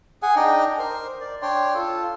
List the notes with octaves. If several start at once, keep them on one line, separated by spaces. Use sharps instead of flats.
G#4 F#5 G#5
D4 D#4 D#5 G5
A#4 C5
D5
D4 C#5 G5 C6
F4 A4